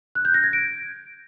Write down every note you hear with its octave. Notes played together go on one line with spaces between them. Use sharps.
F#6
G6
A#6
G#6
D7